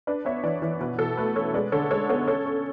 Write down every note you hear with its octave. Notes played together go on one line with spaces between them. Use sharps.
D4 B4 D5
B3 C#5 E5
E3 B4 D5
E3 B4
B2 B4
B2 A4
A3 B4
C#4 A4 C#5
G#3 B4 D5
D3 A4 C#5
G#3 A4 C#5
B3 A4 C#5
C#4 A4 C#5
C#4